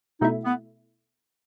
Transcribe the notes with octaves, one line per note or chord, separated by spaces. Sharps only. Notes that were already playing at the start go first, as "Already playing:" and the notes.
B2 A3 D#4 E4
B3